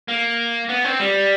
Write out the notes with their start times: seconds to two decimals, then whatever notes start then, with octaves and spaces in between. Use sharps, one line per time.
0.08 A#3
0.69 B3
0.84 C4
1.00 G3